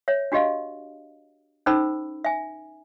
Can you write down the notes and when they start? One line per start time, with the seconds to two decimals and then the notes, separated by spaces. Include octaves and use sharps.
0.08 C#5 E5
0.32 D4 F#4 G4 D#5 F5
1.66 C#4 D#4 A4 C5 B5 E6
2.25 E5 G#5